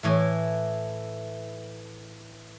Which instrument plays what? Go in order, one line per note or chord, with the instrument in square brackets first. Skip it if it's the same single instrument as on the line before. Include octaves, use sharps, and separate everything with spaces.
[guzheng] A2 E3 A3